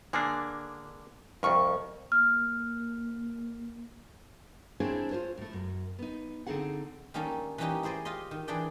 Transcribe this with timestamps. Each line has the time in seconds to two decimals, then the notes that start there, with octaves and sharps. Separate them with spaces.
0.13 D3 A#3 D4 G#4
1.43 C2 F2 A#4 C#6
2.12 A#3 F6
4.80 C4 D4 E4 G#4 C5 C#5
5.11 F4 G4 C5 C#5
5.38 A2 A3
5.53 F#2
5.99 B3 D#4
6.47 D3 C4 C#4 D#4 G#4 F#5
7.14 D#3 G3 A#3 C#4 D#4 A4
7.58 E3 G3 A#3 C#4 D#4 G4
7.83 E4 G#4 C5 D5 D#5
8.05 F4 G4 D#5 C6
8.31 D#3
8.48 E3 D4 G#4 D5 G5